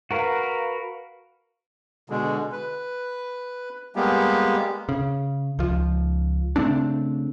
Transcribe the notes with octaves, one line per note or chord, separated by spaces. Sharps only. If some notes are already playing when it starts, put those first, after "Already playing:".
F#4 A#4 B4 F5
B2 D3 G#3
B4
G3 G#3 A#3 B3 G4
C#3
C#2 F3
C#3 A3 C4 D4